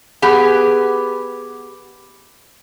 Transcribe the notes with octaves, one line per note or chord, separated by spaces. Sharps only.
B3 G4 G#4